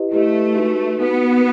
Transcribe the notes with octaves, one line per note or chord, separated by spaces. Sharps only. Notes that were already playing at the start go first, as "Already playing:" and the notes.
Already playing: E4 G4 B4 D#5
A3 E4 G4 B4 D#5
D#4 F#4 B4
B3 D#4 F#4 B4